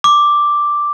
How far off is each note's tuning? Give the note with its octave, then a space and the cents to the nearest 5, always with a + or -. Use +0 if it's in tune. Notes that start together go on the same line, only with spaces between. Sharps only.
D6 +0